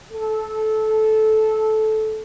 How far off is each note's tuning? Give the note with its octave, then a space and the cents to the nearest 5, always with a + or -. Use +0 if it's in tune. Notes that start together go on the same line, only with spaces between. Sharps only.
A4 -15